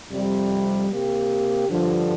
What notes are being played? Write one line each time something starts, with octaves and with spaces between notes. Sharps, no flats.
F2 C3 G3
C3 A#3 G4
G2 D3 F3